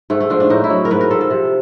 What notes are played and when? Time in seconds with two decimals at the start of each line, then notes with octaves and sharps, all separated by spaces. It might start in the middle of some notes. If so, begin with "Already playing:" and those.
0.10 G#2 A3
0.20 A3
0.30 F3 D4
0.40 D4
0.50 A2 D#4
0.64 E4
0.70 F#3
0.85 A#4
0.90 G#2 B4
1.01 A#4
1.11 F3 A4
1.21 A4
1.30 C3